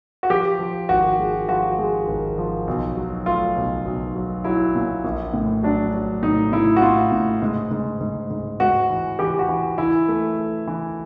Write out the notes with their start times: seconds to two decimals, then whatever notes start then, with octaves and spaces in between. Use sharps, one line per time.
0.23 F#4
0.30 F3 G4
0.59 F3
0.89 G#1 F#4
1.19 G#3
1.49 F3 F#4
1.78 G#3
2.08 G#1
2.38 F3
2.67 B1
2.97 F#3
3.26 A3 F4
3.56 B1
3.86 B1
4.15 F#3
4.44 F#3 E4
4.75 A#2
5.04 A#1
5.34 A2
5.63 F#3 D4
5.93 F#3
6.23 A2 D#4
6.52 A2 E4
6.76 F#4
6.82 A2 F4
7.12 A2
7.42 G#2
7.71 G#2
8.01 G#2
8.30 G#2
8.60 G#2 F#4
8.90 E3
9.19 E3 G4
9.39 F#4
9.49 E3
9.78 E3 E4
10.08 A3
10.38 A3
10.67 E3